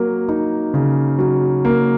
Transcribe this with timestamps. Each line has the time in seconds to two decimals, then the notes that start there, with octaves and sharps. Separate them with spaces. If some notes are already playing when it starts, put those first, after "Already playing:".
Already playing: F#3 A#3
0.29 D#4
0.74 C#3
1.19 F#3
1.65 A#3